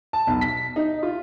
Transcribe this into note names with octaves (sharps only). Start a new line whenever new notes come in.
A5
B1
B6
D#4
F4